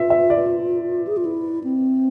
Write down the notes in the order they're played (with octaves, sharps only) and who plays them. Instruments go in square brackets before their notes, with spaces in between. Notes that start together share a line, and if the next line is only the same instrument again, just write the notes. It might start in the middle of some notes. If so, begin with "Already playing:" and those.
Already playing: [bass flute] F4 [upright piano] E5
[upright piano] E5
D5
[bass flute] G#4
F4
E4
C4